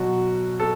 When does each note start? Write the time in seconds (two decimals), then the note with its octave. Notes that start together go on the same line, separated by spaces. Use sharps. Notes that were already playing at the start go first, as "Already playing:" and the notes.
Already playing: B2 F#3 F#4
0.60 A4